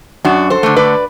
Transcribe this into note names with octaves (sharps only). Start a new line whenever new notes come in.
F#2 D4 F#4
A4 C5
D3 A3
B4 D5